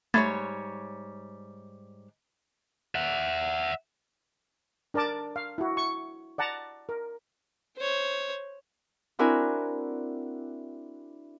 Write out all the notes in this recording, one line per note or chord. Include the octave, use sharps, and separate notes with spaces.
G#2 G3 A3 C#5 B5 G#6 A6
E5 F#5
D4 A#4 D5 A5 D6
F5
E4 F#4
C#6
D5 F#5 A5 A#5
A#4
C5 C#5
C4 D4 E4 F#4 A#4 G#5